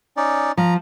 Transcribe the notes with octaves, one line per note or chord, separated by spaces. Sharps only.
C#4 D#4 D5
F3 A#5